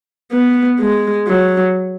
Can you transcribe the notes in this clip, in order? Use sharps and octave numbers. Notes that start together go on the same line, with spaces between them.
B3
G#3
F#3